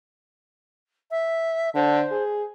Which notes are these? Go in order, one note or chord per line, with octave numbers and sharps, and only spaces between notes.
E5
D3 C5
G#4